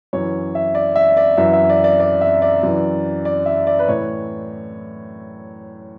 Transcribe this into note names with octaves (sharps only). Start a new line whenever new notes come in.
F#2 E3 C#5
E5
D5
E5
D5
F#2 E3 E5
E5
D5
D5
D5
E5
D5
F#2 E3
D5
E5
D5
B4
A2 E3 C#5